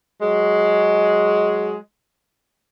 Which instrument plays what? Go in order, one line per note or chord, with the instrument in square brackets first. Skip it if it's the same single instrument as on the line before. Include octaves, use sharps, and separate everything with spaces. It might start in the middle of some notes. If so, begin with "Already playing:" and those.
[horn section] F#3 G#3